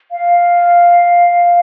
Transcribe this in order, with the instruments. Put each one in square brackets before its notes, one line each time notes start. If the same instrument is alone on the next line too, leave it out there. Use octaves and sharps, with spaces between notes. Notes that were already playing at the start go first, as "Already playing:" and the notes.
[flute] F5